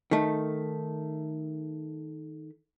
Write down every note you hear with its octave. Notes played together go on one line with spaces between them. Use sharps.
D#3 A3